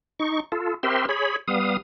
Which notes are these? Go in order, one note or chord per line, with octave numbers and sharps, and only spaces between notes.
D#4 C#6
F4 A4
C4 G4 A#4 E5 C6
G#4 C#5 B5
G3 B3 F5 D#6